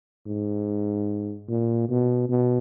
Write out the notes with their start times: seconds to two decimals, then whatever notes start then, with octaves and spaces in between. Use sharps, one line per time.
0.26 G#2
1.48 A#2
1.88 B2
2.29 B2